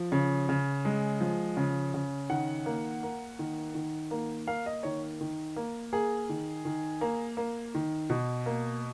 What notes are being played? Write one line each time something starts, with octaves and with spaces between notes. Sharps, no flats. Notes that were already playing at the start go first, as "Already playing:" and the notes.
Already playing: F3
C#3
C#3
G#3
F3
C#3
C#3
D#3 F#5
A#3
A#3
D#3
D#3
A#3
A#3 F5
D#5
D#3 C#5
D#3
A#3
A#3 G#4
D#3
D#3
A#3
A#3
D#3
B2
A#3